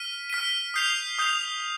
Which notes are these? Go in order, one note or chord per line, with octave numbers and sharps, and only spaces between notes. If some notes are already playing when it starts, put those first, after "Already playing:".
Already playing: F6 B6 D#7
F6 B6 D#7
D#6 G6 C7 F7
D#6 G6 C7 F7